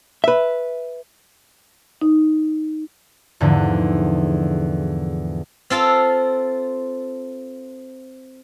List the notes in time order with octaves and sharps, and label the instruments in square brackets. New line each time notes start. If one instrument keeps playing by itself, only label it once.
[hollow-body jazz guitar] B4 E5
[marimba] D#4
[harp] E2 G#2 D3 F3
[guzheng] C4 F4 A4 F5